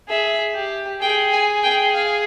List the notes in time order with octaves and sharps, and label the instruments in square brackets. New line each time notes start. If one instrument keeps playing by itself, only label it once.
[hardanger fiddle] G#4 [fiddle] E5
[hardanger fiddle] G4
[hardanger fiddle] G#4 [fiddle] G5
[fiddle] G#5
G5
F5